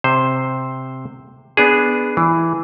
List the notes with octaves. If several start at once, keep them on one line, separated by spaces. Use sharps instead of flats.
C3 C5
B3 D4 G#4
E3